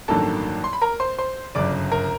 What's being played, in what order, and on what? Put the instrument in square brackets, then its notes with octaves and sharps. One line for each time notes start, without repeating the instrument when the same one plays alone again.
[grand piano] A1 G2 D#3 F#3 A#3 A4 A5
C6
B5
A#4 A#5
C5 C6
C5 C6
G1 F#2 C#3 D5 D6
A#4 A#5